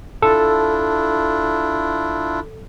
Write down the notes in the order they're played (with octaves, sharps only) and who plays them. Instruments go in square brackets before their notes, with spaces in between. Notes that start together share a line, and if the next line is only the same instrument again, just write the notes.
[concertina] D4 E4 F4 [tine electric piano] A4